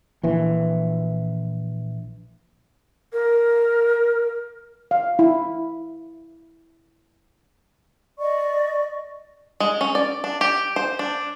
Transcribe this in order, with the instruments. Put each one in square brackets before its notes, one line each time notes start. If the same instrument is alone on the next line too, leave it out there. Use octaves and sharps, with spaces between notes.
[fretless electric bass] A#1 E3
[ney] A#4
[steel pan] F5
E4
[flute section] D5 D#5 C#6
[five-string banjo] G#3
C#4
D5
D4
G4
C5
D4